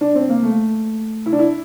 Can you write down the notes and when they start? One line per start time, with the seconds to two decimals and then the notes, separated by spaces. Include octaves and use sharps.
0.01 D4
0.15 C4
0.29 A#3
0.43 A3
1.26 E4
1.32 D4
1.39 E4